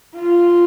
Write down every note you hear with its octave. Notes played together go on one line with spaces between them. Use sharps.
F4